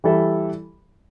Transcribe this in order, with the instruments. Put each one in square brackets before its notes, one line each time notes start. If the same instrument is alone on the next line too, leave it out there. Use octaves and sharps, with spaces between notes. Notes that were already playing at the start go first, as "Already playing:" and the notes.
[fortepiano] E3 G3 E4 A4 E5